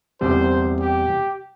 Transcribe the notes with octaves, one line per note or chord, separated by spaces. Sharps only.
E2 C3 G3 C5
G4